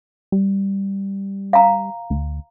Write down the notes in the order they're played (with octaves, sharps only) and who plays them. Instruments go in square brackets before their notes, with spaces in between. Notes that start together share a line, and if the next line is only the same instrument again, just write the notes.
[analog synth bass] G3
[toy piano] F5 A#5
[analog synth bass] D2